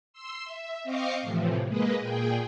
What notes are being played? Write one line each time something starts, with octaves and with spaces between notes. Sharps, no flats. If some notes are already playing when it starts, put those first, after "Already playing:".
C6 E6
E5
C4 D#5 F5 C#6 D6 C7
A2 C3 E3 F3
G#3 A#3 B4 D#5
A#2 G#4 G5